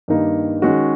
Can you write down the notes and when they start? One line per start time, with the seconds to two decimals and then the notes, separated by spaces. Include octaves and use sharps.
0.08 G2 D#3 G3 A#3 D#4
0.62 D#3 G#3 C#4 F#4